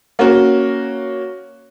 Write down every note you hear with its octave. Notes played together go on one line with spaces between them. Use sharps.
A#3 C#4 F#4